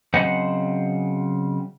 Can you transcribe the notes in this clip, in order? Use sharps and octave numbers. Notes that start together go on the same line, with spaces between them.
C#3 F#3 C4 C5 D#5 F#5